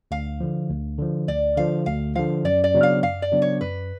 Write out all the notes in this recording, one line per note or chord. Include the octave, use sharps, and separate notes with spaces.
D2 F5
D3 F3
D2
D3 F3
D2 D5
D3 F3 F5
D2 F5
D3 F3 F5
F#2 D5
D5
C#3 F#3 B3 D4
F5
F#2 F5
D5
C#3 F#3 B3 D4
C#5
F#2 B4